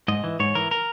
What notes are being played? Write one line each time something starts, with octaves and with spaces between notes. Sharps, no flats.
G#2 D#5
E3
G#2 C#5
E3 A#4
A#4